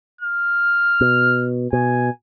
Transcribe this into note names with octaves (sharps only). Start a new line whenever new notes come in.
F6
B2
B2 G#5